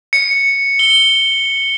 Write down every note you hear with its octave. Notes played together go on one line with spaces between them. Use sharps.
C#7
G7